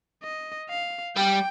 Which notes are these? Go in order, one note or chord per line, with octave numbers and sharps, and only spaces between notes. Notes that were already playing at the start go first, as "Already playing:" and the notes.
D#5
F5
G3 G5